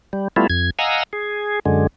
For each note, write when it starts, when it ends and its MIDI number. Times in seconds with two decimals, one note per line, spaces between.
0.13 0.28 55
0.36 0.47 55
0.36 0.47 57
0.36 0.47 59
0.36 0.47 64
0.36 0.47 65
0.50 0.70 41
0.50 0.70 92
0.79 1.03 75
0.79 1.03 77
0.79 1.03 78
0.79 1.03 80
0.79 1.03 82
0.79 1.03 88
1.13 1.59 68
1.66 1.87 42
1.66 1.87 50
1.66 1.87 56